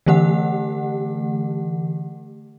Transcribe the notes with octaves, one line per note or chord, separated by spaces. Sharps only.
D3 E3 A3 G4 F#5